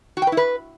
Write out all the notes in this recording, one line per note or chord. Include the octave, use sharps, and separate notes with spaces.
F#4
G5
B4
E4
B4